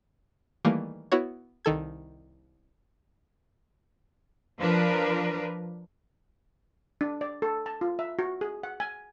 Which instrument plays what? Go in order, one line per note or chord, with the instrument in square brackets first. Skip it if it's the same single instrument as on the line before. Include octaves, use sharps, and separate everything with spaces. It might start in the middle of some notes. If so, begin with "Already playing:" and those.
[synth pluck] D#3 E3 G3 A3 A#3
B3 E4 F#4 C#5
C2 D#3 A4 G#6
[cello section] F3 D4 A#4 B4
[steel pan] D4
D5
A4
A5
F4
E5
F#4
G#4
F#5
G#5